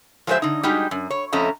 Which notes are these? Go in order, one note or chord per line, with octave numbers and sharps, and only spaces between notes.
F3 F#3 G#3 A3 C5 E5
D3 D#4
G3 G#3 D#4 F#4 G4
F#2
C#5
F2 A3 C#4 D#5 A#5